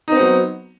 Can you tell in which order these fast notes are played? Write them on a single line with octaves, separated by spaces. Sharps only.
D#4 C4 B3 F#3